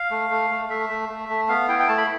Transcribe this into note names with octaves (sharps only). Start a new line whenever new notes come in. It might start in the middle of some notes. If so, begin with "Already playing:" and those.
Already playing: F5
A3
A3
A3
A3 E5
A3
A3
A3
B3 F5
E4 G5
G5
A3 A5
B5